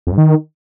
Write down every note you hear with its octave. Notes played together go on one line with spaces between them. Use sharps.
F2
G2
D#3